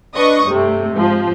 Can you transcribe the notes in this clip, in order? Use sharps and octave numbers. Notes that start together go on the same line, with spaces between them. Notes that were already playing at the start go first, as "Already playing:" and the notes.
D4 B4 D#5 C#6 D#6
G2 C3 A3
G#2 F3